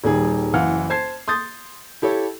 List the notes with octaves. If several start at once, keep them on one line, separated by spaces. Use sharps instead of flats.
D#1 D#3 G3 G#4
F#1 E3 F5 F#5 F6
C5 A5 G#6 C7
C6 D#6 G6 A6
E4 G4 A4 C#5